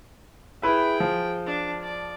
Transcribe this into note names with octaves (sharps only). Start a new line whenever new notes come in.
E4 G#4 B4 E5 G5
F3
D4
D5